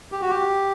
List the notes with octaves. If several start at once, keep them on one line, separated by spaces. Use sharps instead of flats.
G4
F#4
G4